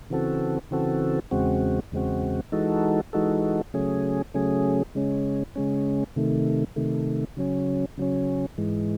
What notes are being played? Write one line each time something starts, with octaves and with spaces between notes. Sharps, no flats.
C#3 E3 C4 F#4 A4
C#3 E3 C4 F#4 A4
E2 C#3 G#3 C4 F#4
E2 C#3 G#3 C4 F#4
E3 G#3 D#4 F#4 A4
E3 G#3 D#4 F#4 A4
C#3 F#3 A3 C#4 G#4
C#3 F#3 A3 C#4 G#4
C#3 G#3 C#4
C#3 G#3 C#4
C3 D#3 A3
C3 D#3 A3
C#3 F#3 C#4
C#3 F#3 C#4
G#2 E3 G#3